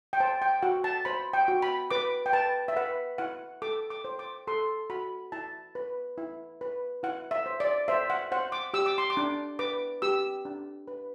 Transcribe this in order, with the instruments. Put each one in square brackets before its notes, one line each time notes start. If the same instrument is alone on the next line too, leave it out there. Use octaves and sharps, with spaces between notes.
[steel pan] G5
C5 A5
G5
F#4 F#5
A5
C5 B5
G5
F#4
B5
B4 D6
G5
B4 A5
E5
B4 F#5
E4 F#5
A4 D6
D6
C5
D6
A4 C6
F#4 B5
E4 A5
B4
E4
B4
E4 F#5
E5
C5
D5
C5 E5
F#5
C5 F#5
D6
G4 E6
D6
C6
D6
D4
B4 D6
G4 E6
D4
B4